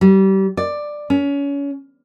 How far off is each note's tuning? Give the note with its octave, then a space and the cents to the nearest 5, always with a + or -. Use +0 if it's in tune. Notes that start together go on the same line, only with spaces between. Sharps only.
G3 -30
D5 +10
C#4 +25